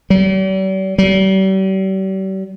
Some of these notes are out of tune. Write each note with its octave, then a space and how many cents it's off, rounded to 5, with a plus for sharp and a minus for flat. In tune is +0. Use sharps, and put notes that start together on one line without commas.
G3 -45
G3 -40